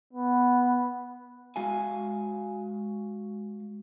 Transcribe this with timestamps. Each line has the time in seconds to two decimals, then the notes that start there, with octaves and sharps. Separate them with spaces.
0.13 B3
1.56 G#3 F#4 F5 G#5